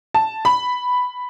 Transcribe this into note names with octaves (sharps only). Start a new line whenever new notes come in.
A5
B5